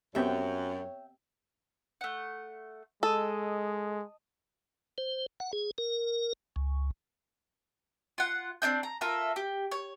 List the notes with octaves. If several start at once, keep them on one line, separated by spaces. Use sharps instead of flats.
F#2 B3 C4 G4 C#5 E5 G5
A3 F#5
G#3 A4 D#5 A5
C5
F#5
G#4
A#4
C#2
F4 F#5
C4 D4 D#4 G6
A#5
F4 A4 A#4 E5
G4
C#5